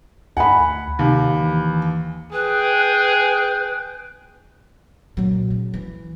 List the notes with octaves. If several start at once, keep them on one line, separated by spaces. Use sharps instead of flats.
D2 F#5 G#5 B5
D#2 C3
E3
G#4 B4 G5
A#2 F#3
C#3
E3